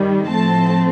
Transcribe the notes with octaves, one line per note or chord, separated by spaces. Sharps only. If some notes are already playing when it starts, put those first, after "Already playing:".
Already playing: G2 D#3 G3
A2 F3 A3 C4 A5